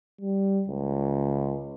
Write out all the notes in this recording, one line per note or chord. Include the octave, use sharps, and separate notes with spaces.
G3
C#2